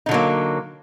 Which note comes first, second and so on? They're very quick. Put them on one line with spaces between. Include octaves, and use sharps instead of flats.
D#4 D3 F#3 A#3